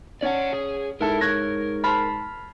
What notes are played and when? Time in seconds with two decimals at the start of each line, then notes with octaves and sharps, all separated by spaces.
0.22 C#4 D5 F#5
0.54 G#4
1.01 G#2 E4 A4 A#4
1.21 C#5 F#6 G#6 A#6
1.84 C5 A5 B5 F6